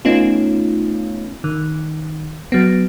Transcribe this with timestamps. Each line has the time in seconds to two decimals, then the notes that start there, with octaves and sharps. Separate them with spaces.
0.05 A3 B3 C#4 D#4 F4
1.44 D#3
2.52 F#3 B3